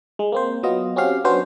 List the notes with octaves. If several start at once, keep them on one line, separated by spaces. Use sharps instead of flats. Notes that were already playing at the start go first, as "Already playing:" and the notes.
G#3
A#3 C4 C5
F#3 B3 F4 D#5
C4 C#4 F#4 G4 F5
F#3 B3 C#4 D4 F#4 C5